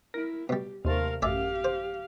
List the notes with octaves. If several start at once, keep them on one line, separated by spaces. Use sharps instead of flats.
E4 A#4
B2 G3 G4
D#2 C3 A3 A#4 F5
A1 F#2 G4 D5 E5 F5 G#5
C5